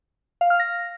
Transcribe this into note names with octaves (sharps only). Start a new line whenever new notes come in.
F5
F6
A#6